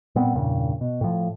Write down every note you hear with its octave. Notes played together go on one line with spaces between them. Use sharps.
A#2 G3 B3 C4
E2 G2 A#2 C#3
B2
A2 F3